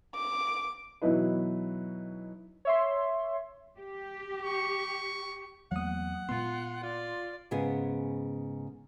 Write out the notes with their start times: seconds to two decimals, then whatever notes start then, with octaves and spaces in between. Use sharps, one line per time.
0.15 D6
1.02 B2 E3 F#3 D#4 E4 B4
2.65 C#5 E5 C6
3.78 G4
4.43 C#6
5.72 E2 F#3 A3 A#3 F#5 D#6
6.29 A#2 G#3 B3 F4 C6
6.83 F4 D5
7.51 G#2 C#3 B3 G#4